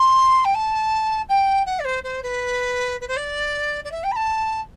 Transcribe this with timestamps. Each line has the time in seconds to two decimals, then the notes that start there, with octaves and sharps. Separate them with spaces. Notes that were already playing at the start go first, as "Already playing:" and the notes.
Already playing: C6
0.45 G5
0.55 A5
1.29 G5
1.66 F#5
1.80 D5
1.85 C5
2.04 C5
2.23 B4
3.01 B4
3.08 C5
3.17 D5
3.85 D5
3.92 E5
4.04 G5
4.12 B5
4.16 A5